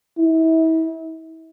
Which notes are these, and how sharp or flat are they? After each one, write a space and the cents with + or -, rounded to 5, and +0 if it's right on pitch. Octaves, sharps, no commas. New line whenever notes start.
E4 -35